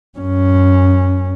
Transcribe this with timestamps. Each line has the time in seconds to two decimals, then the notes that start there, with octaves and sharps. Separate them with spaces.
0.19 F#2 C#4